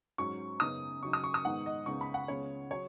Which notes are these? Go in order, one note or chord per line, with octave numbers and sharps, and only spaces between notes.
G#2 F#3 C#4 C#6
F#2 C#3 B3 D#4 D#6
C#3 F#3 D#4 C#6
D#6
C#6
D#6
G#2 D#3 B3 D#4 F#5
D#5
C#2 C#3 B3 D#4 C#6
B5
F#5
C#2 C#3 B3 C#5
F#3 C#5